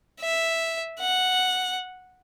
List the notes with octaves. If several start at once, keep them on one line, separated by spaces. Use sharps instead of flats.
E5
F#5